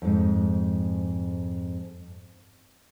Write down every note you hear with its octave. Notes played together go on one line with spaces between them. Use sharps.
F2 G#2